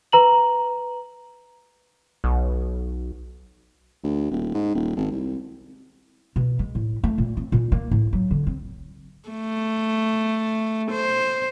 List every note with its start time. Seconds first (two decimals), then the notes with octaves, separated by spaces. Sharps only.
0.12 B4 A#5 F#7
2.24 B1
4.04 D2
4.31 D#1
4.54 G#2
4.75 D#1
4.97 G#1
5.12 C2
6.36 B2
6.59 G#3
6.75 A2
7.04 A3
7.18 A#2
7.37 C4
7.52 A#2
7.72 A#3
7.91 A2
8.13 F#3
8.31 D3
8.47 C4
9.29 A3
10.91 C5